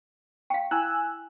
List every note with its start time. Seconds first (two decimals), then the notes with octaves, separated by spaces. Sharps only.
0.50 F5 G5
0.71 E4 G#5 E6 F#6